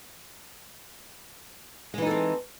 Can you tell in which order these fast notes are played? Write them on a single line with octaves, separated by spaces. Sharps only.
G#3 E3 D#4 A4 C4